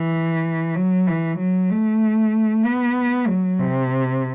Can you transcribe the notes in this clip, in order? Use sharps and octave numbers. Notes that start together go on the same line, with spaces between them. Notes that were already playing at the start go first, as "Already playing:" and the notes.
Already playing: E3
F#3
E3
F#3
A3
B3
F#3
C3